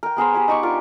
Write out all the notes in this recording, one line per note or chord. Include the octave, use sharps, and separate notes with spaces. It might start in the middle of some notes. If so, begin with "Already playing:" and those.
A#4 G5
B3 G#4 A#4 C5
G4 B4 G#5
D#4 C#6 D6
D4 F4 A#4